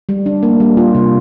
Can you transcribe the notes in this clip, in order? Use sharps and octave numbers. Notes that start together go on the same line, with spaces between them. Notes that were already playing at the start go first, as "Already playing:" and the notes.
G3
D4
A#3
G3
F4
C3